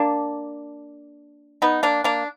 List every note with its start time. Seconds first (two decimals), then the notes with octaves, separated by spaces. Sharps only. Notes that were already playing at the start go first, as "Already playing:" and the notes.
Already playing: A#3 D4
1.62 B3 D#4
1.83 A#3 D4
2.04 A#3 D4